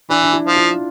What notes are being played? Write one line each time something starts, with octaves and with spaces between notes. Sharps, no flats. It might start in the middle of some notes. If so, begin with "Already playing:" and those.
E3 D4
D4
E4
F3
F4